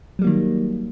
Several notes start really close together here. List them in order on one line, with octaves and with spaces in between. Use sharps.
F#3 G3 A#3 D#3